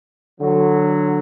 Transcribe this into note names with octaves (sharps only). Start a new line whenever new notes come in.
D3 F#3